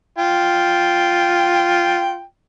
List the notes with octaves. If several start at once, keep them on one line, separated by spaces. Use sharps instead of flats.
F4 G5